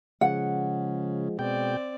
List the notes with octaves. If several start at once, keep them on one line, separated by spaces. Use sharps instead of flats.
C#3 F3 G#3 F#5
B2 G#3 C4 D5 G5